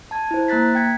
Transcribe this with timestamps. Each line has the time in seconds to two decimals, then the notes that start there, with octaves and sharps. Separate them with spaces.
0.11 A5 G#6
0.31 E4 C5
0.48 A#3 A#5 F#6 A6 B6
0.75 G5 G#6 B6